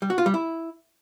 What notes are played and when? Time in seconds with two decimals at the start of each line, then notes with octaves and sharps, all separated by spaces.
0.02 G3
0.10 F#4
0.18 F4
0.26 G3
0.34 E4